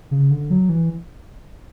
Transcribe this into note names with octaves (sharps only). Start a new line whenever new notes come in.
C#3
D3
F#3
E3